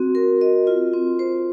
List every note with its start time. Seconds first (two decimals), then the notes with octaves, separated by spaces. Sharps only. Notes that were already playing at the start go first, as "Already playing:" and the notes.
Already playing: C4 F#4
0.15 A#4
0.41 D#5
0.67 F4
0.93 C4
1.19 C5